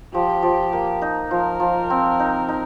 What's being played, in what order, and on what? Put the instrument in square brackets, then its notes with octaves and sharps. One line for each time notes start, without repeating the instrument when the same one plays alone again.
[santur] F3 [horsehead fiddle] G4
[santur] F3
A#3
D#4
[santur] F3 [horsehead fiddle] A#4
[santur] F3
C4
D#4
D#4